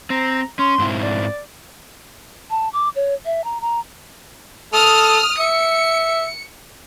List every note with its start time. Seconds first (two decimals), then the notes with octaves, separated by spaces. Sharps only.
0.10 C4 A#5
0.59 C#4 C6
0.79 G#2 C4 E4
1.02 D5
2.50 A5
2.73 D6
2.96 C#5
3.25 E5
3.44 A#5
3.61 A#5
4.74 A4 D#6 F6
5.39 E5 C#7